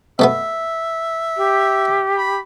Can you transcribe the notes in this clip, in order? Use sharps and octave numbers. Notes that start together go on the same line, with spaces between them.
B2 A3 B3 E5
G4
B5